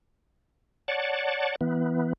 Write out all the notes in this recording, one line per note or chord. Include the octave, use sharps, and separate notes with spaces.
C#5 D5 F#5 A5
E3 B3